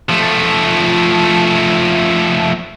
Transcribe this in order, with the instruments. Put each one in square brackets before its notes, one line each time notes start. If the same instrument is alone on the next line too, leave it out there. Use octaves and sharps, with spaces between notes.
[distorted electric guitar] F3 A3